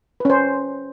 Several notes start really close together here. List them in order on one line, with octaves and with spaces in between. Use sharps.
B4 C#4 C5